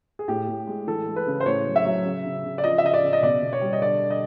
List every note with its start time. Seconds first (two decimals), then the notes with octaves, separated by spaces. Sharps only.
0.19 G#4
0.28 A2 G4
0.47 A2
0.67 G#3
0.87 E3 A4
1.07 G#3
1.16 B4
1.27 C#3
1.40 C5
1.46 A2 C#5
1.66 F#3
1.76 E5
1.85 F#3
2.05 C#3
2.25 C#3
2.45 C#3
2.58 D5
2.64 F3 D#5
2.78 E5
2.83 C#3 D#5
2.94 D5
3.03 C#3
3.13 D#5
3.22 B2 D5
3.42 B2
3.53 C#5
3.61 G3
3.73 D#5
3.82 D3 D5
4.02 D3
4.10 D#5